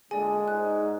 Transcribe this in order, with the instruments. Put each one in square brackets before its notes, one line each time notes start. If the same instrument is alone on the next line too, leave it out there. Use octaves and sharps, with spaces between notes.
[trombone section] A#2 D3 [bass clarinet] G#3 [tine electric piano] G#4 [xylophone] D5 G#5
[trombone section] G#2 [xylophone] F#6